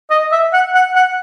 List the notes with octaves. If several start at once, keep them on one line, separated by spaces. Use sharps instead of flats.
D#5
E5
F#5
F#5
F#5